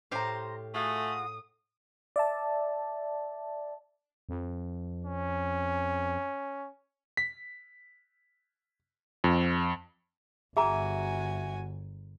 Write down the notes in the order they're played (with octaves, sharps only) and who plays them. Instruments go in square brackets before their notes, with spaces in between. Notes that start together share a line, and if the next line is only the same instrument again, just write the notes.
[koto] A2 G4 F5 [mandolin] C5 A#5
[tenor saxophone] A3 [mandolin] F4 F#4 G#4 [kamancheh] D#6
[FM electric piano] D5 E5 A5
[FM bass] F2
[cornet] C#4
[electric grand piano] B6
F2
[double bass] G1 [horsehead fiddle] F#4 G#5 [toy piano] G#4 A#5 [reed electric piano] E5